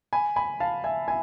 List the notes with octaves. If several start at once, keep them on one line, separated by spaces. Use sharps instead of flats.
G#5 B5
G#5 B5
F5 A5
E5 G#5
E5 G#5